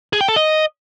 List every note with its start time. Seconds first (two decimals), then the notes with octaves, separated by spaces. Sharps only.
0.13 G#4
0.21 G5
0.29 A4
0.36 D#5